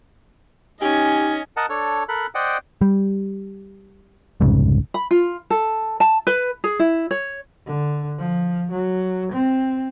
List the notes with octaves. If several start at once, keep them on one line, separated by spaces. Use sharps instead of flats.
C#4 D#4 G4 D#5 G#5
A#4 D#5 F#5 A5
D4 A4 C#5
A4 A#4 B5 F#6
C5 D5 D#5 F#5 G5
G3
F1 C2 G#2 C#3
B5
F4
A4
A5
B4
G#4
E4
C#5
D3
F3
F#3
C4